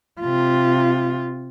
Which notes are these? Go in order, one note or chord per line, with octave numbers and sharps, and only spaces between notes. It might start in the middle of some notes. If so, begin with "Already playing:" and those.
C3 F4